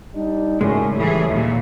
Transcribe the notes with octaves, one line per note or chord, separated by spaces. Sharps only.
G3 D4 D#4
C#2 F#2 A2 G#3 C#4
A2 E3 G3 G#4
D#2 A#2